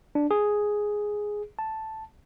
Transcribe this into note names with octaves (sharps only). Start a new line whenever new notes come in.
D4
G#4
A5